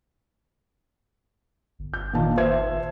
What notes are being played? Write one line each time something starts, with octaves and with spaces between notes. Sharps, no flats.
G1
G6
A#2 D#3 A5
C5 E5 G#6